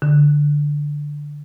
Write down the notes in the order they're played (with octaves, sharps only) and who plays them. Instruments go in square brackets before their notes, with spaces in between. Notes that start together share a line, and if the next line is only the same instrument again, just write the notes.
[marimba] D3